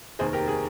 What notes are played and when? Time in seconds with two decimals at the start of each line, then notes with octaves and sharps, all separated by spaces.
0.19 F1 D#2 D#3 G#4 C5
0.33 G4 A#4
0.48 G#4